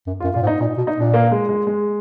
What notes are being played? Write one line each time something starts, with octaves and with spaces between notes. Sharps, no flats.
F#2
F#2 F4
A#2 F4
G#2
D#4
A#2 D#4
B2
D#4
A#2 D4
A#3
G#3
G#3
G#3